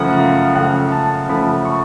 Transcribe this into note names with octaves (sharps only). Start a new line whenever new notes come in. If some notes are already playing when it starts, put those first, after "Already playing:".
Already playing: F#2 C#3 F3 A3 F#5
F#2 F5
C#3 F3 A3 F#5
F#2 A5
C#3 F3 A3 B5
C#6